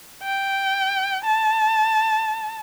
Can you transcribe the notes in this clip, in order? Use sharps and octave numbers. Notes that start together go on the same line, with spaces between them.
G5
A5